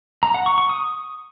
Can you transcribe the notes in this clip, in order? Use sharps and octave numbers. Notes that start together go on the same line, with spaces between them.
A#5
F#5
C#6
C#6
D#6